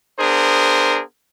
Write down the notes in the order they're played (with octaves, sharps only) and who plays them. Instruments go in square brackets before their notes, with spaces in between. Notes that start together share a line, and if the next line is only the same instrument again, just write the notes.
[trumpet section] B3 D4 G#4 A#4 C5